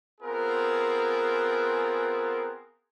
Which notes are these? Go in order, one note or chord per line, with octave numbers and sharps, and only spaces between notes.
B3 C4 F4 G#4 A#4